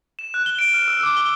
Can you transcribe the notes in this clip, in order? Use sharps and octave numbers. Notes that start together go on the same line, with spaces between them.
E7
F#6
G7
D7
F6
E6
D6
G7